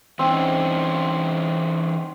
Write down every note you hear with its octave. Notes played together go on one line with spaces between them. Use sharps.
E3 C4 C#4 D#4